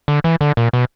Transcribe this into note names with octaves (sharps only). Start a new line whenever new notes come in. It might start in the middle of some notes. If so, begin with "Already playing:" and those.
D3
E3
D3
A#2
B2